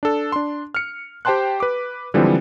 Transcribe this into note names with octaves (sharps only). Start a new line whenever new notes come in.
D4 A4
D4 C6
F6 C#7
G4 C5 G5 A5 C6 F#6
B4 D6
D3 E3 F3 G3 G#3 C4